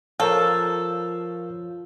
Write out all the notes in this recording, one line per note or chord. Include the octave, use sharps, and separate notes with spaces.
F3 A4 A#4 C#5 F5